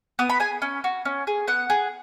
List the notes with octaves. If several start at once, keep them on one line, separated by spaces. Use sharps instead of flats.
B3 D#6
B5
G#4 G#5
C#4
F#4
C#4
G#4
B3 F#5
G#4